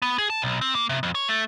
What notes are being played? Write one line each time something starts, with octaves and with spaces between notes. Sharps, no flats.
B3
G#4
A5
B1
C4
A#3
C3
F2
C#5
A3